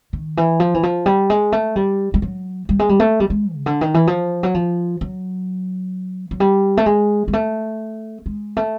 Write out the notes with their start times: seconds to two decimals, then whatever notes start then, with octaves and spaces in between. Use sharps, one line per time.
0.13 D#3
0.37 E3
0.60 F3
0.74 E3
0.83 F3
1.06 G3
1.30 G#3
1.52 A3
1.76 G3
2.14 G3
2.22 F#3
2.69 G3
2.79 G#3
2.89 G3
3.00 A3
3.20 G3
3.30 G#3
3.53 C#3
3.66 D3
3.81 D#3
3.94 E3
4.07 F3
4.43 F#3
4.54 F3
5.01 F#3
6.31 F#3
6.40 G3
6.77 A3
6.86 G#3
7.28 G#3
7.33 A3
8.26 G#3
8.57 A3